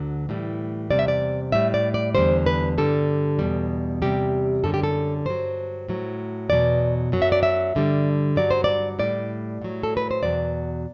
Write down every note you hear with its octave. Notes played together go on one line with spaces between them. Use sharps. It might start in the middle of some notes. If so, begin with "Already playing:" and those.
Already playing: D2 D3 F#3
A2 E3 G3
E2 C3 G3 D5
E5
D5
A2 G3 E5
D5
D5
E2 D3 G3 C5
B4
G2 D3 G3 A4
E2 B2 G3
E2 C3 G3 G4
F#2 D3 G3 A4
G4
A4
G2 F#3 C5
A2 F#3
E2 B2 F#3 D5
F#2 F#3
E5
D5
E5
G2 D3 G3
G2 F#3 D5
C5
D5
A2 G3 D5
A2 F#3
A4
B4
C5
E2 B2 F#3 D5